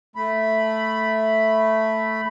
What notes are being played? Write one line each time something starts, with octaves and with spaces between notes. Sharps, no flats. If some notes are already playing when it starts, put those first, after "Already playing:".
A3 B5